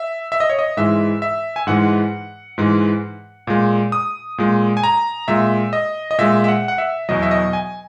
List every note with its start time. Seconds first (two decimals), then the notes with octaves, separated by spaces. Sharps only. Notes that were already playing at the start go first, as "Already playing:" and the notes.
Already playing: E5
0.32 E5
0.40 D#5
0.50 C#5
0.59 D#5
0.77 G#2 E3 G#3 E5
1.22 E5
1.56 G#5
1.67 G#2 E3 G#3 F#5
2.58 G#2 E3 G#3
3.47 A#2 G#3
3.92 D#6
4.38 A#2 G#3
4.77 G#5
4.83 A#5
5.28 A#2 G#3 E5
5.73 D#5
6.11 D#5
6.18 A#2 G#3 E5
6.44 E5
6.48 F#5
6.68 F#5
6.78 E5
7.09 E2 B2 F#3 D#5
7.22 E5
7.31 D#5
7.53 G#5